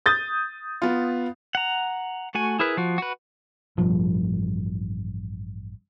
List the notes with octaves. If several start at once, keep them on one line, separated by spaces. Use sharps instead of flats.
D#6 G6 A6
B3 F4
F#5 A#5
A3 F#4 G#5
E4 G#4 A#4 B4
F3 F#4
F#4 B4
A1 G2 B2 F3